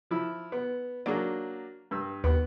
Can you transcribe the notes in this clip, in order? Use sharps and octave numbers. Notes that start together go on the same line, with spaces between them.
F3 E4
B3
F#3 A#3 D4 G#4 D5
G2 E6
D#2 B3 G4